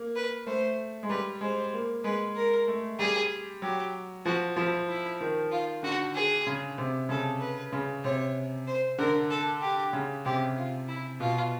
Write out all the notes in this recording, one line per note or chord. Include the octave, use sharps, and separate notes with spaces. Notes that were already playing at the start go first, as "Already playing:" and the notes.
Already playing: A#3
B4
A3 C5
G#3
G3 B4
G#3 C5
A#3
G#3 B4
A#4
A3
G3 G#4
F#3 G4
F3 F#4
F3 E4
E4
D#3
F4
D3 F#4
G#4
C#3
C3
C#3 A4
B4
C#3
C3 C#5
C5
D3 A#4
A4
G4
C#3
C3 G4
F4
E4
B2 F4